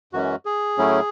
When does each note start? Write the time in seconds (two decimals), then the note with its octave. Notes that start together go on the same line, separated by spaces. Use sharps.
0.13 F#2 E3 G#3 C#4 F#4
0.45 G#4
0.78 A2 F#3 A3 C#4 E4